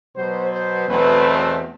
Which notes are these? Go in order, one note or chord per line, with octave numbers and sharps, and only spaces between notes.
B2 F#3 B3 C5
C5
E2 B2 F#3 A3 C4 B4